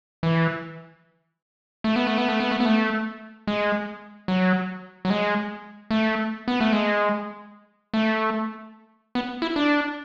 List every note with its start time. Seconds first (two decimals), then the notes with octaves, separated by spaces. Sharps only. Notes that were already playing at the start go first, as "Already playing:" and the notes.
0.23 E3
1.84 A3
1.96 B3
2.07 A3
2.18 B3
2.29 A3
2.40 B3
2.51 A3
2.60 B3
2.66 A3
3.47 G#3
4.28 F#3
5.05 F#3
5.10 G#3
5.91 A3
6.48 B3
6.60 A3
6.72 G#3
7.94 A3
9.15 B3
9.42 E4
9.56 D4